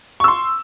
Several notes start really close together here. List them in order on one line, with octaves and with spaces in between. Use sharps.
C#6 E6 C6